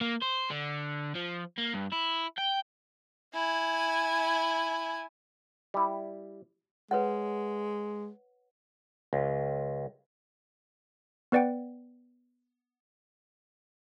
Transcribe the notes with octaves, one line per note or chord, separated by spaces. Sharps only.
A#3
C5
D3
F3
A#3
G2
E4
G5
E4 G#5
G3 E4
G#3 B4 C#5 F#5
C#2
B3 B4 D5 F#5 G5